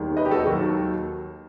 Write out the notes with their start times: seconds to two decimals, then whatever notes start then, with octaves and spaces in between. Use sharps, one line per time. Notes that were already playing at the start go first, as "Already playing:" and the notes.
Already playing: E1 D#2 D#3 G3
0.17 B4 D#5
0.25 G4
0.31 F#4 A4
0.46 D#2 D#3 F#3 F#4 A4